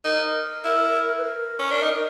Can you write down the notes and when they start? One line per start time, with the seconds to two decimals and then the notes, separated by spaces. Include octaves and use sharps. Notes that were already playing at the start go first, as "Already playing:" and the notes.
0.04 D#4 A#4
0.64 E4
1.18 B4
1.24 A#4
1.59 C#4
1.71 D4
1.83 D#4